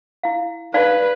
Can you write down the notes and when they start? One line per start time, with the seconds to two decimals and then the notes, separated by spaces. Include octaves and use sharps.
0.23 E4 F5
0.74 D#4 B4 D5 F5